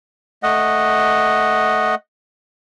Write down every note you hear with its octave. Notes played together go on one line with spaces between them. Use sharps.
A3 D#5 F#5